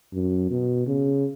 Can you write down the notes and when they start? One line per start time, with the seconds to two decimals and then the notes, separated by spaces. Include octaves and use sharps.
0.14 F#2
0.51 B2
0.87 C#3